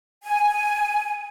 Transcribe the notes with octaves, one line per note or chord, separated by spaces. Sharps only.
G#5